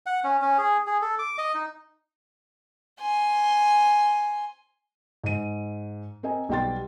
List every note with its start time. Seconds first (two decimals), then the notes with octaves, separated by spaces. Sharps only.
0.06 F#5
0.24 C#4
0.42 C#4
0.58 G#4
0.87 G#4
1.02 A4
1.19 D6
1.38 D#5
1.54 D#4
3.00 G#5 C6
5.23 G#2 D#7
6.23 C4 A#4 D#5 G#5
6.49 B1 G3 B3 G5 C6 A6